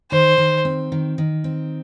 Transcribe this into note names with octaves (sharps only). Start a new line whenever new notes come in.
D#3 C5
D#3
C4
D#3
D#3
C4